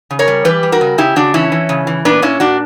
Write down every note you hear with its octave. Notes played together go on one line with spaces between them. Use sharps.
C#3
A#4 C#5
G3
E3 G4 B4
G3
F#4 A#4
C#3
C#3 E4 G4
C#3 D4 F#4
E3 C#4 E4
E3
C#3
E3
A#2 B3 D4
A#2 C#4 E4
A#2 D4 F#4